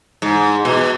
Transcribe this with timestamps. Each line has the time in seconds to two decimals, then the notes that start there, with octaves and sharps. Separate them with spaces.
0.22 G#2
0.65 B2